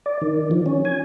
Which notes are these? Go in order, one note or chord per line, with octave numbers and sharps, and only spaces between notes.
D5
D#3
F3
C#4
G#5